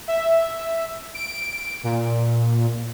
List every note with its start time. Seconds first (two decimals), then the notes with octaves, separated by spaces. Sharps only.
0.08 E5
1.14 D7
1.83 A#2